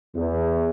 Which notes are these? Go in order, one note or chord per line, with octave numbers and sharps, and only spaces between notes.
E2